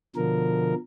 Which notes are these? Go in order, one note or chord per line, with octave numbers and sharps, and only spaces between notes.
B2 D3 F3 A#4